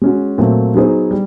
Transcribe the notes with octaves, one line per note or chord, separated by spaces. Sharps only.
G#3 C#4 F#4
A#2 F#3 A3 C4
F#3 B3 D#4 G#4 C5
G3